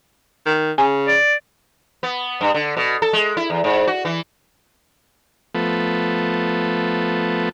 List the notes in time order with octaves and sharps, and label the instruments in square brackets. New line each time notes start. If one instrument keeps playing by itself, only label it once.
[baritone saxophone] D#3
[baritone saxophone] C#3 [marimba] G#5
[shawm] D5
[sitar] B3
G2
D3
B2
A4
G#3
E4
E2
G#2
F#4
E3
[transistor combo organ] F3 A3 B3